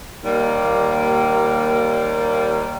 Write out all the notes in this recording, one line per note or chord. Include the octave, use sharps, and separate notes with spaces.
D#2 G3 A#3